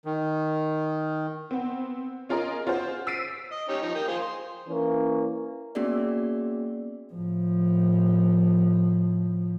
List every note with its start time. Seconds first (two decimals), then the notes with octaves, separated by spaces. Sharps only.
0.05 D#3
1.51 B3 C4
2.29 C#4 F4 G#4 A#4 D#5
2.66 C#4 F4 F#4 G#4 C5
3.07 E6 A6 B6 C7 D7 D#7
3.52 D#5
3.69 C#4 D#4 G4
3.82 F3 D#4
3.95 A#3 G5 D#6
4.08 F4 G#4 C5
4.22 C6
4.68 E3 A#3 C#4
5.75 A#3 B3 C#4 F#4 G#4 D5
7.13 A2 F3